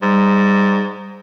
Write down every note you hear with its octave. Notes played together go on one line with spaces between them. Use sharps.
G#2 G3